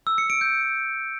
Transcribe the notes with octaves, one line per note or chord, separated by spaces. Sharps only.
E6
C#7
D7
G6